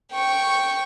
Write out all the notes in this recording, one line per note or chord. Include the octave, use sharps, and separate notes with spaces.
G5 C#6